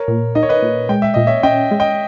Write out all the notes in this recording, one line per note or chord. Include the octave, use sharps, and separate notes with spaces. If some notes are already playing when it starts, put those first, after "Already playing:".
Already playing: A#4 C#5
A#2
D#4 D#5
C#5
B4 D#5
A#2
G#3 G5
E5
A#2 D#5
C#5 E5
C#4 D#5 G5
G#3
D#5 G5